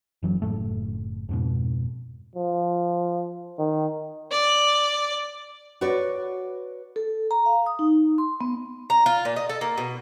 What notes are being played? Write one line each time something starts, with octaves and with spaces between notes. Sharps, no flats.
F#1 E3 F#3
F#1 A2 A3
F2 G#2 B2
F3
D#3
D5
F#4 B4 C#5 D5
A4
A#5
F5
D#6
D#4
C6
B3
A#5
F4
A#2
D#5
A4
A#3
B2